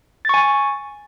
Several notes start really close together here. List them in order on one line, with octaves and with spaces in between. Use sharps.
A6 C#6 G#5